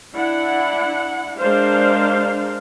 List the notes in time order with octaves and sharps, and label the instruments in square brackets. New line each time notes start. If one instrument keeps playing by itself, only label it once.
[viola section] D4 E4 F#5
G#3 D4 A#4 C5 F5